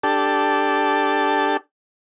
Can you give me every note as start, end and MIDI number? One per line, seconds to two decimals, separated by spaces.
0.03 1.57 62
0.03 1.57 67
0.03 1.57 69